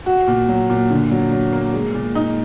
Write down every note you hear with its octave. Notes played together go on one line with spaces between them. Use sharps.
F#4
A#2
F#3
A#2
D3
F#3
F#3
A#3
G#3
A#2
D#4